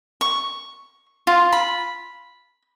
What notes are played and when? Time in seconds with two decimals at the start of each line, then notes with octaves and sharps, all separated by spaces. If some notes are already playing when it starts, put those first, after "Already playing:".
0.21 C#6
1.27 F4
1.52 B5